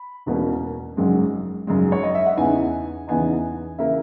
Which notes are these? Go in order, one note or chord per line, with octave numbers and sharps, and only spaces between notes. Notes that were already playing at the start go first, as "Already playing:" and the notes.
Already playing: B5
E1 E2 B2 A#3 C#4
G#1 F#2 C#3 G#3
G#1 F#2 C#3 G#3
C#5
D#5
E5
F#5
E2 C#3 E3 B3 D#4 G#5
E2 C#3 E3 B3 D#4 G#5
C#3 E3 A#3 E5